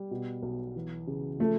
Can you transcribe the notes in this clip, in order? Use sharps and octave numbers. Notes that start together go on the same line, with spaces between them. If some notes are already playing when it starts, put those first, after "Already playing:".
Already playing: G3
B2
B1
E3
C#3
F3 A3